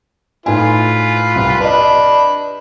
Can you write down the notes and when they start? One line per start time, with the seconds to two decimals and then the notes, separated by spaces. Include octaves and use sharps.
0.46 A2 D#4 F4 B4 G#5
1.35 C2
1.60 D4 B4 D#5 B5